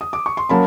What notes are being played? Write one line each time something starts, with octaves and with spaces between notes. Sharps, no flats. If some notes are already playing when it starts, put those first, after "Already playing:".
D#6
D6
C#6
C6
F#3 A#3 C#4 A5 B5